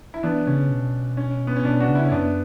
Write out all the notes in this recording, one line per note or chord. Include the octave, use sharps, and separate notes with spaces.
E4
E3 B3 D4
C#3 C#4
B2
C#4
B3
C#4
B2 B3 D4
D4 F#4
C#3
C#4 E4
C#4
F#2 B3 D4